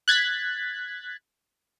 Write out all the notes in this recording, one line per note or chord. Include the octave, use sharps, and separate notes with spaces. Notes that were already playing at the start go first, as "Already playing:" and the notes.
F#6 G#6 A6 B6